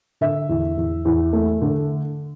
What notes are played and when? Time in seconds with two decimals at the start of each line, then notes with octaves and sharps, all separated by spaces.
0.21 D3 E5
0.49 E2
0.77 E2
1.05 E2
1.33 A3
1.62 D3